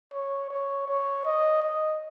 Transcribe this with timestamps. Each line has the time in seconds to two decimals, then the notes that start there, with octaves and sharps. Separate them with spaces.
0.13 C#5
0.50 C#5
0.88 C#5
1.25 D#5
1.62 D#5